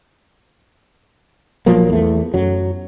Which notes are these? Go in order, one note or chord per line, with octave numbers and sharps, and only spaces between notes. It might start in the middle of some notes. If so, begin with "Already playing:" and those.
A#1 F3 F#3 A#3
E2 A3
F#2 F#3